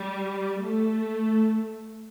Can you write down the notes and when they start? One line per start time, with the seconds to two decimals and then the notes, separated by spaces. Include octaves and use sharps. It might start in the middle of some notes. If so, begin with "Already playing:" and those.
Already playing: G3
0.61 A3